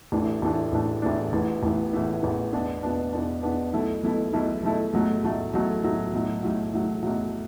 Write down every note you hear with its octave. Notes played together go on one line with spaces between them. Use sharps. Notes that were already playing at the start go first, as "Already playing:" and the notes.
A1 A2 E3 A3 D4
A1 A2 E3 A3 D4
A1 A2 E3 A3 D4
A1 A2 E3 A3 D4
A1 A2 E3 B3
A1 A2 E3 B3
A1 A2 E3 B3
A1 A2 E3 B3
E2 B2 B3 D4
E2 B2 B3 D4
E2 B2 B3 D4
E2 B2 B3 D4
B1 B2 A3 E4 A4
B1 B2 A3 E4 A4
B1 B2 A3 E4 A4
B1 B2 A3 E4 A4
B1 A2 F#3 A3
B1 A2 F#3 A3
B1 A2 F#3 A3
B1 A2 F#3 A3
B1 A2 F#3
B1 A2 F#3
B1 A2 F#3
B1 A2 F#3